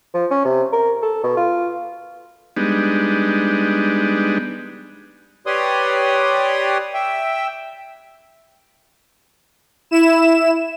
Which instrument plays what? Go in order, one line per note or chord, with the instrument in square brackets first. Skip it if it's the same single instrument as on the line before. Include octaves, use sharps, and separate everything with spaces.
[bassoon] F3
C#4
C3
A#4
A4
B2
F4
[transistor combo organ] G3 G#3 B3 D4 D#4
[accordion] G4 B4 C#5 D5 C6 D#6
E5 G5
[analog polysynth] E4 E7